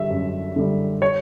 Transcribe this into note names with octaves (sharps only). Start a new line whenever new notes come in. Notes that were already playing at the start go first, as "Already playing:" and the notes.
Already playing: D3 G3 E5
F#2
D3 G3
C#5